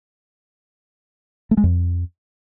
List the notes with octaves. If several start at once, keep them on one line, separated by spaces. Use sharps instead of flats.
A3
G#3
F2